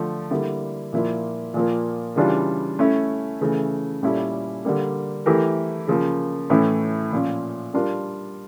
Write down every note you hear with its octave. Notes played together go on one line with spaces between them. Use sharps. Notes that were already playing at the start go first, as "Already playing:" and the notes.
Already playing: D3 F3 A3
D3 G3 A#3 E4
A#2 F3 A#3 E4
A#2 F3 A#3
C#3 E3 G3 D4 F4
A3 C#4 E4
C#3 E3 A3
A#2 G3 C#4 E4 A4
D3 G3 A#3
E3 A3 E4 G4 A#4
C#3 F3 A#3
A2 E3 A3 C#4 E4
A#2 F3 C#4 F4
G3 D4 F4 A#4